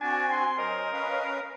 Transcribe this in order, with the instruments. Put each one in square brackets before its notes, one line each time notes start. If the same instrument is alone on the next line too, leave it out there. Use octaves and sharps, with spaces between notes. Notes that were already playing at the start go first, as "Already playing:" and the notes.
[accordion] C4 F#4 [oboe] D4 [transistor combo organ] G#5
[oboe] C6
[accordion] F#3 C5 [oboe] A#4 [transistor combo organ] D#5
[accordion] C#4 B4 F5